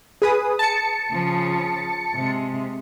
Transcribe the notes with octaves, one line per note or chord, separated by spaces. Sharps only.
G#4 B4 D#6
A5 C#7
C#3 F3
C3 G#3